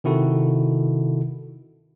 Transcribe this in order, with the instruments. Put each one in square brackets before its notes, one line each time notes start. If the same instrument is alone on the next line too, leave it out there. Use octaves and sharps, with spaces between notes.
[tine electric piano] C3 D#3 E4 F#4 A4